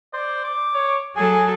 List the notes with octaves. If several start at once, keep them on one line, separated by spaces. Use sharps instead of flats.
C5 D5
D6
C#5
F#3 G#4 A4 G#5